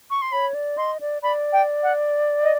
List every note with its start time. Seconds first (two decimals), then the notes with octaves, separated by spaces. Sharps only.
0.10 C#6
0.21 C6
0.32 C#5 B5
0.54 D5
0.77 D#5 C6
1.01 D5
1.22 D5 B5
1.52 G5
1.83 F#5
2.43 D#5